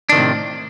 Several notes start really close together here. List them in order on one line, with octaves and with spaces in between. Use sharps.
D4 D#3 C3 A2